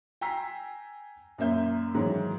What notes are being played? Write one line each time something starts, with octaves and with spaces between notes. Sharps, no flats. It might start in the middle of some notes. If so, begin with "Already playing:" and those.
G5 G#5 A#5 E6 B6 C7
F#2 A#2 A#3 E5 G6
G#2 D#3 E3 F#3